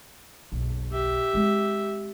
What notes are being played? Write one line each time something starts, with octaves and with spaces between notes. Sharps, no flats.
F#1 B1
G4 E5
G#3 C4